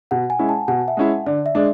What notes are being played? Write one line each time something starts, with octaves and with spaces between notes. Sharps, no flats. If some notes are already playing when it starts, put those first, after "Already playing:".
B2 F#5
G#5
G#3 C#4 E4
A5
B2 F#5
E5
G#3 C#4 E4
D3 D5
E5
G#3 D4